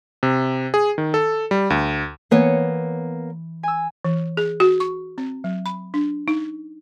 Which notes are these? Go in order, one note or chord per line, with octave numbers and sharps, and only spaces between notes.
C3
G#4
D#3
A4
G3
D2
E3 A#3 B3 C#5
G#5 E6
E3
G#4
F#4
C#6
C4
F#3
B5
D4
D#4